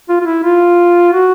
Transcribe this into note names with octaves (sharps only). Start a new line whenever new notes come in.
F4
F4
E4
F4
F#4